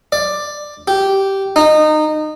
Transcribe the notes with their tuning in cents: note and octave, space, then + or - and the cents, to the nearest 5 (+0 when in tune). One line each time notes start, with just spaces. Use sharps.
D5 +10
G4 -10
D#4 -20